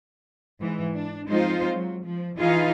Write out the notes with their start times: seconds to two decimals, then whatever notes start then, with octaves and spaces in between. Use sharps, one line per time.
0.60 G#2 E3 G#3
0.93 D4
1.27 F3 G#3 C4 D#4 F4 C5
1.71 F#3
2.04 F3
2.38 E3 D#4 F4 G#4 B4 F5